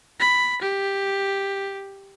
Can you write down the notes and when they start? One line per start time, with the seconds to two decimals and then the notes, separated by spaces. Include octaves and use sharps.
0.20 B5
0.62 G4